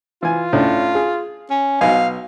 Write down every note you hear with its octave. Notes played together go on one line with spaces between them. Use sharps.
E3 F4 G#5
A2 C#4 D4
G#4
C#4
B1 D#5 F5 G#5